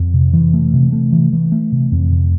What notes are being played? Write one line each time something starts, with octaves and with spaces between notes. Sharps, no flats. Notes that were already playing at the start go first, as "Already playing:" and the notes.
Already playing: F2
C3
E3
A3
C3
A3
E3
E3
A3
C3
F2
C3